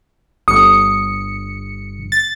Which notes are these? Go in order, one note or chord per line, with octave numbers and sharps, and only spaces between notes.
G1 D#6 C#7
A6